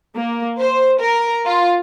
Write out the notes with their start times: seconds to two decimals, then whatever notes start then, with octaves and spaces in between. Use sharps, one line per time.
0.16 A#3
0.60 C5
1.02 A#4
1.46 F4